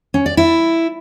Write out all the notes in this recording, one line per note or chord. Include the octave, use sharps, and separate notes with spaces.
C#4
D5
E4